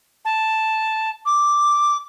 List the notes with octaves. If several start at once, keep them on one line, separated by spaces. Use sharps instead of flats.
A5
D6